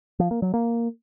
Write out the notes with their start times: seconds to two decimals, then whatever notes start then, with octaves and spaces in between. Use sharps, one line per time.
0.19 F3
0.31 A#3
0.42 F#3
0.54 A#3